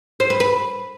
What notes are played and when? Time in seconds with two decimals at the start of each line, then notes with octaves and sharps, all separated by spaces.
0.20 C5
0.30 B4
0.40 B4